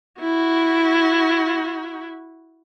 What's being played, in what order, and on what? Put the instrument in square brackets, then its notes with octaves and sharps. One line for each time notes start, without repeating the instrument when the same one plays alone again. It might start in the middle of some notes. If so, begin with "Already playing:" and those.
[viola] E4 F#4